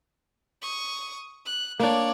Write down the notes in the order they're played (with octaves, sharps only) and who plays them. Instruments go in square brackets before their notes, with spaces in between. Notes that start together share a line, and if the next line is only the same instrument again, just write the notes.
[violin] C#6 D#6
F#6
[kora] A#3 D4 [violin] C#5 D5